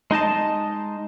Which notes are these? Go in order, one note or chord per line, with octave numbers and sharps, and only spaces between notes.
G#3 D#4 D#5 A5